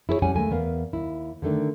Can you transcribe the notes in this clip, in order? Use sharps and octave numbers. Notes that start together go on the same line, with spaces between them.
E4 G#4 B4 C#5
F2 G3 C#4 C#5 F#5 G#5
D#2 G#3 A3 G#5
E2 B3 A#4 F5
D#2 E4
D3 D#3 A3 D4